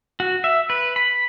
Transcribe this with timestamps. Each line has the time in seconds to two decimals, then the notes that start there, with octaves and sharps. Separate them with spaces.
0.20 F#4
0.44 E5
0.70 B4
0.96 B5